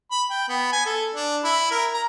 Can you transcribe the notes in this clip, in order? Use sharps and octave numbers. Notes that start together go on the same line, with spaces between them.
B5
G5
B3
G#5
A4
D4
E4
A#4
A#5